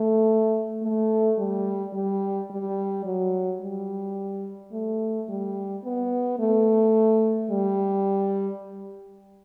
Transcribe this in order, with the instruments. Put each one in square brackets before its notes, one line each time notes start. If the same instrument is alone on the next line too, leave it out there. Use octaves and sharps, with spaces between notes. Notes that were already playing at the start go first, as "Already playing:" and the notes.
Already playing: [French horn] A3
A3
G3
G3
G3
F#3
G3
A3
G3
B3
A3
G3